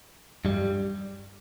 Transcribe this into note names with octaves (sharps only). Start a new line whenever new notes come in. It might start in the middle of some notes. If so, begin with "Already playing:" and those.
G2 G3